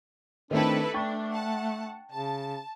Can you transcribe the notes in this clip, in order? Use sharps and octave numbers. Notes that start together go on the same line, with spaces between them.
D#3 A3 C4 D4 E4 A4 B4
A3 D4 G5 C#6 A6
F#5 A5
C#3 A5